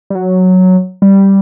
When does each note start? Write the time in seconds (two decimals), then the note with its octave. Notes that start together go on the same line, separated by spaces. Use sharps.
0.10 G3
0.15 F#3
1.02 G3